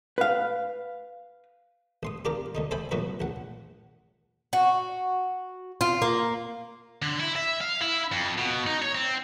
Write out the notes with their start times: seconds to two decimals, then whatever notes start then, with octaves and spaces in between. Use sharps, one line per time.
0.18 B4 F5
2.03 A1 C6 D#6
2.25 D4 F4 G4 A#4 A#5 D6
2.55 D2 D3 D#4
2.71 A4 C5 E5 G5 G#5 B5
2.91 A1 F2 A#2 F#3 F#4 B4
3.20 A#1 F#5
4.53 F#4
5.81 F4
6.02 A#3
7.02 D3
7.20 E4
7.36 E5
7.60 F5
7.81 E4
8.12 F2
8.38 B2
8.67 D#4
8.82 C#5
8.95 C4